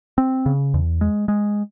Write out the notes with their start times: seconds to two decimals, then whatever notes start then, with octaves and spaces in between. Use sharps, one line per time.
0.18 C4
0.46 C#3
0.74 E2
1.01 G#3
1.28 G#3